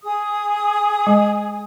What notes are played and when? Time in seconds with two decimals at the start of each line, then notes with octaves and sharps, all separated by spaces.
0.03 G#4 D#6
1.07 G#3